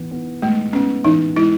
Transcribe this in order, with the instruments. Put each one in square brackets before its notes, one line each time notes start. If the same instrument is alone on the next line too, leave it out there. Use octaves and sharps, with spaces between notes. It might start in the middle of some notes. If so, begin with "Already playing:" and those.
Already playing: [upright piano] E3 B3
B3
[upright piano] G#3 [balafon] A3
[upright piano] B3 [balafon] C#4
[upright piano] E3 [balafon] D#4
[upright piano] G#3 [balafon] E4